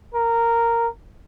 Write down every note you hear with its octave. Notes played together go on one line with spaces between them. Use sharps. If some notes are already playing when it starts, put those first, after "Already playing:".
A#4